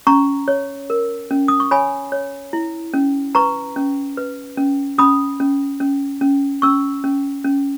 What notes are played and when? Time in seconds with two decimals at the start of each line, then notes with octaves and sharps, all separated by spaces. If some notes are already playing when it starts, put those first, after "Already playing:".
0.07 C#4 A#5 C#6
0.48 C#5
0.90 A#4
1.31 C#4
1.48 D#6
1.60 C#6
1.71 C#5 G#5 B5
2.12 C#5
2.53 E4
2.94 C#4
3.35 B4 A#5 C#6
3.76 C#4
4.17 B4
4.57 C#4
4.98 C#4 B5 D#6
5.40 C#4
5.80 C#4
6.21 C#4
6.62 C#4 C#6 E6
7.04 C#4
7.45 C#4